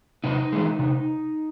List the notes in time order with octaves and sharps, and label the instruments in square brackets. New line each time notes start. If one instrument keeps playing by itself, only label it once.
[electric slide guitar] C3 D#4
E3 G#3
C3